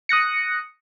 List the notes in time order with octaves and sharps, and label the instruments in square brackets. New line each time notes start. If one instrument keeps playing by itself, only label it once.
[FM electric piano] D#6 F#6 A#6 C#7